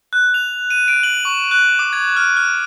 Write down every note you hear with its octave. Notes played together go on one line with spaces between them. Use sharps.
F#6
F7
D#7
D7
F#7
C#6
F#6
D6
G#6
F6
F6